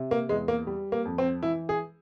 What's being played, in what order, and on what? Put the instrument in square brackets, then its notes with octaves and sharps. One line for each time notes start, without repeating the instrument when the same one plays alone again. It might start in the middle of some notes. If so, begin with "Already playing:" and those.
Already playing: [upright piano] C3
A#3
E2 G#3
A#3
G3
A#3
F2
C4
E3 E4
G#4